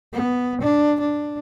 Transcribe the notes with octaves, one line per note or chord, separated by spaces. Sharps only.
B3
D4
D4